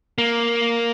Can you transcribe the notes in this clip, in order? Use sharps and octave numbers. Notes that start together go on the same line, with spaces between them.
A#3